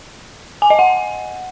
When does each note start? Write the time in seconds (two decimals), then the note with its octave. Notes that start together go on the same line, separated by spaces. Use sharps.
0.62 G#5
0.70 D#5
0.79 F#5